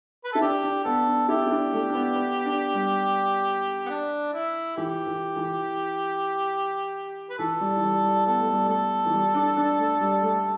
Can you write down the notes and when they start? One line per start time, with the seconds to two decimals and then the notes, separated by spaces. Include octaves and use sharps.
0.24 B4
0.33 E4 A4
0.42 D4 G4
0.63 D4
0.85 B3 A4
1.07 D4
1.28 E4 G4
1.46 E4
1.51 D4
1.72 A3
1.89 D4
1.95 B3
2.15 B3
2.45 D4
2.74 G3
3.86 B3
3.90 D4
4.33 E4
4.77 E3 G4
5.06 E3
5.36 E3
7.30 B4
7.39 E3 A4
7.61 G3
7.76 E3
7.83 G3
8.04 G3
8.26 B3 A4
8.40 A3
8.53 G3
8.66 A3 A4
9.05 E3
9.13 G3
9.34 D4
9.57 D4
9.78 A3
10.01 G3
10.22 A3